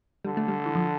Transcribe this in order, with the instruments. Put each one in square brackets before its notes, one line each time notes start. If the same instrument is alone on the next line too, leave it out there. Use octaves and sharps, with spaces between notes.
[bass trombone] D3 [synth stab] G3
[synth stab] A3
G3
E3
F3